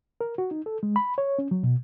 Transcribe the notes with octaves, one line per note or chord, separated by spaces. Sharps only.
A#4
F#4
D#4
A4
G#3
B5
C#5
C#4
F#3
B2